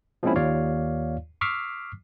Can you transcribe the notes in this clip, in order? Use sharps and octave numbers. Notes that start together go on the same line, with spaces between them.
F3 G#3 A#3 C4 C#4 E4
D#2 F4 C#5 D5 F5
C#6 D6 E6 F6 B6 C7